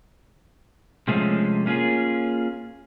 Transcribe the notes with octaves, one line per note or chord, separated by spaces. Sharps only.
C3 F3 G#3 A3 C#4
A#3 C#4 F4 G#4